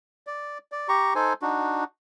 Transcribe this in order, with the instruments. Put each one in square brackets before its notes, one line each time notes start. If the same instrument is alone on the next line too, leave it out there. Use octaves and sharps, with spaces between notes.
[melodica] D5
D5
G4 A#5 C#6
D#4 A4 C5 G#5
D4 D#4 F#4